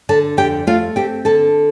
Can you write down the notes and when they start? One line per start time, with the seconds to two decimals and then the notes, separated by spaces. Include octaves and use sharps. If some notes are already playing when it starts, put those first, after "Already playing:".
0.09 D3 A4 A5
0.37 F2 G4 G5
0.67 A3 F4 F5
0.96 C4 G4 G5
1.25 D3 A4 A5